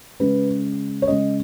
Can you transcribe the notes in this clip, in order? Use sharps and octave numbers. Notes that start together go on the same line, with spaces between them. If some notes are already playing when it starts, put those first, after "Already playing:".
C#3 G#3 C#4 B4
C#5
C#3 G#3 C#4 D#5